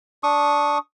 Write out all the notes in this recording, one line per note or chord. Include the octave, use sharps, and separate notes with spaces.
D4 C#6 D#6